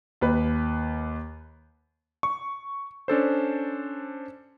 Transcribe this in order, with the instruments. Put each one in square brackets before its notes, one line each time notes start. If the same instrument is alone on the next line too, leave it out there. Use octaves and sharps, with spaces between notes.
[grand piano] D#2 B4
[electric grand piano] C#6
C#4 D4 A4 C5